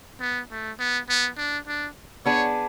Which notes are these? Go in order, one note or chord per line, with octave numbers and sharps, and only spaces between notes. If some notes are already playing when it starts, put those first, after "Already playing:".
B3
A3
B3
B3
D4
D4
B3 D4 G#4 C#5